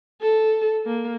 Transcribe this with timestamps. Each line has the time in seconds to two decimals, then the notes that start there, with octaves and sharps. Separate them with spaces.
0.21 A4
0.86 A#3